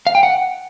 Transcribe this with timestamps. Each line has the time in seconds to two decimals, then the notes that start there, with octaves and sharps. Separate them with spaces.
0.07 F5
0.15 G5
0.23 F#5